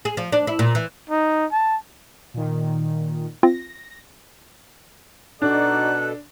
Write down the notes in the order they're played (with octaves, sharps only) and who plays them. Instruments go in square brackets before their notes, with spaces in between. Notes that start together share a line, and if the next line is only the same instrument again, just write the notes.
[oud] G#4
F3
D4
E4
A#2
E3
[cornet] D#4
A5
[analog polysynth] A#2 D#3
[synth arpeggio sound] C4 F4 [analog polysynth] A#6
[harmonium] B2 A4 [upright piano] D4 [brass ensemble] D#4 F#4 D5 [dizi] F#6